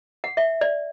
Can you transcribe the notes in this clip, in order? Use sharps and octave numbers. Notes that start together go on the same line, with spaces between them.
F#5
E5
D5